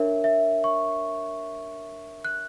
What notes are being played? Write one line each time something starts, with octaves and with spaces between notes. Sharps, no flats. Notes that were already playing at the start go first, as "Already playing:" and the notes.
Already playing: D4 A#4 C#5 E5
E5
C#6
F#6